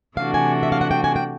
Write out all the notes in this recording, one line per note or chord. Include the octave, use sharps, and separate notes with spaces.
C3 E3 A3 D4 F#4 F5
G#5
E5
F5
F#5
G5
G#5
G5